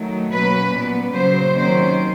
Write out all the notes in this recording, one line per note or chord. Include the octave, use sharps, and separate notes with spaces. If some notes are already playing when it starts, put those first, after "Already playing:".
Already playing: D#3 F#3 A3
B2 F#3 A#3 C#4 B4
A#2 G3 B3
C#3 F#3 A#3 C5
C3 D#3 F#3 A#3 C#4 C5